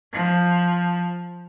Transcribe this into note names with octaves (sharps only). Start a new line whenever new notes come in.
F3